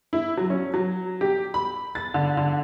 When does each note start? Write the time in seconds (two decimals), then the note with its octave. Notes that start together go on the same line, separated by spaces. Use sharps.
0.13 E4
0.37 F#3
0.50 C#4
0.74 F#3
1.21 G4
1.54 B5
1.95 A6
2.14 D3
2.37 D3